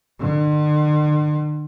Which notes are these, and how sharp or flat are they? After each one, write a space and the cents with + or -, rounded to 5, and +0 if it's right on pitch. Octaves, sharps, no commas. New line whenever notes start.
D3 +45